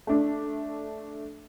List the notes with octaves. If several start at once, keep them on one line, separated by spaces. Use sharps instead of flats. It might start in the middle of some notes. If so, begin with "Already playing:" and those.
A3 D4